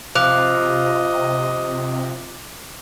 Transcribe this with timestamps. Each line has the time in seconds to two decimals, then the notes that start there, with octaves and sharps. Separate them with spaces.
0.15 C3 F3 D#5 D6 F#6 F7